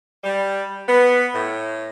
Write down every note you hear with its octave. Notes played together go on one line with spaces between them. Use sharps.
G3
B3
A2